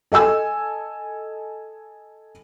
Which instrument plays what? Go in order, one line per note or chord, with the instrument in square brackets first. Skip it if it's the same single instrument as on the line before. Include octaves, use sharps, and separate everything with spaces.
[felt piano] A4 D#5 G#5 E6